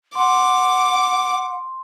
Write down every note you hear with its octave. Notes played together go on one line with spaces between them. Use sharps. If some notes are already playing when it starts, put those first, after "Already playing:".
F#5 C6 D6